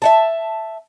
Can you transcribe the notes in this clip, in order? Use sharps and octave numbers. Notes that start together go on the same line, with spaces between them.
E5 F#5 A5